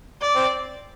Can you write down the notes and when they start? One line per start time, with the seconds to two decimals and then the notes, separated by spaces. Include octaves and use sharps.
0.21 D5
0.36 C4